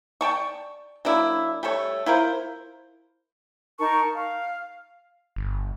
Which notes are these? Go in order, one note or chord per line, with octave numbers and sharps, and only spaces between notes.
D5 G5 A5 C#6
F#3 A#3 D4 E4
G3 A3 A4 C#5
E4 F4 A#4 C5
D#4 A#4 A5 C#6
F5
G1